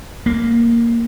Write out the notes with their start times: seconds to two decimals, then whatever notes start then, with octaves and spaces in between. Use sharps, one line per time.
0.26 A#3